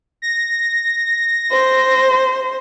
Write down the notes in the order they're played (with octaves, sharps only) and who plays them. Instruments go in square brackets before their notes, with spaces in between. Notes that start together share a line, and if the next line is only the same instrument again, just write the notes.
[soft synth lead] A#6
[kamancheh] C5